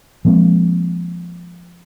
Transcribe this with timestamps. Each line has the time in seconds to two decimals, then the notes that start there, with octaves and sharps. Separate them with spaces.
0.25 F3 G#3 A#3 C4